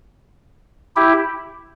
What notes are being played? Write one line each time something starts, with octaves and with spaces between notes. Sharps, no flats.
E4 G4